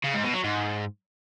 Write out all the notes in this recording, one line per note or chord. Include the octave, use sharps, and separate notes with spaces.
C#3
G#2
B2
F#3
G#2